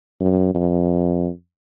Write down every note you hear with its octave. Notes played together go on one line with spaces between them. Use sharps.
F#2
F2